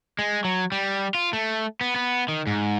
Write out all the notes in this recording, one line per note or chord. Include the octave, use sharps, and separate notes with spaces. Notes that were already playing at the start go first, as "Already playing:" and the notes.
G#3
F#3
G3
F4
A3
B3
B3
D#3
G#2